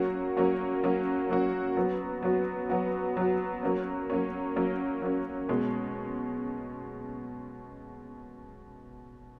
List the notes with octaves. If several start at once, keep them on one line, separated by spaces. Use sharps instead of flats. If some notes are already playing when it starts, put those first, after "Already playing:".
Already playing: F#3 A#3 C#4 F#4
F#3 A#3 C#4 F#4
F#3 A#3 C#4 F#4
F#3 A#3 C#4 F#4
F#3 B3 F#4
F#3 B3 F#4
F#3 B3 F#4
F#3 B3 F#4
F#3 A#3 C#4
F#3 A#3 C#4
F#3 A#3 C#4
F#3 A#3 C#4
B2 G#3 C#4